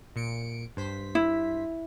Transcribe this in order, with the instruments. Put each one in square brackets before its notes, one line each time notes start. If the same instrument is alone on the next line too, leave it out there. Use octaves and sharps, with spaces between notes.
[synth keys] A#2 C#7 D7
G2 C5 B6
[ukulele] E4